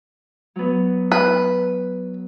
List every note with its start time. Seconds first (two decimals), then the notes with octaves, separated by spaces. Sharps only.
0.56 F#3 B3
1.12 B4